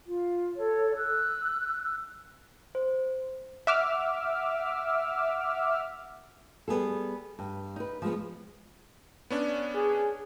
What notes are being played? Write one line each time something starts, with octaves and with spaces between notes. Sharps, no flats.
F4
A4 C#5
E6 F#6
C5
E5 F#5 D6 E6 F6
G3 B3 G#4 A4
G2
D#4 B4
F3 G#3 B3
B3 C#4 D4
G#4